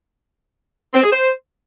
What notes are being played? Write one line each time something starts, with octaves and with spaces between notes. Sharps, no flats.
C4
G#4
C5